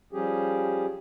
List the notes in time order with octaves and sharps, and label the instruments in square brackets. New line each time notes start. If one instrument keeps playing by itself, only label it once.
[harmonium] F3 G3 C#4 G4 G#4